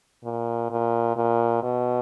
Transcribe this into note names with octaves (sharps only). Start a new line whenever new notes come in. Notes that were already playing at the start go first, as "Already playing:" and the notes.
A#2
A#2
A#2
B2